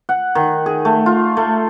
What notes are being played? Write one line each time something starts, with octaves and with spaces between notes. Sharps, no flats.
F#5
D#3
G#4
A3
F4
A3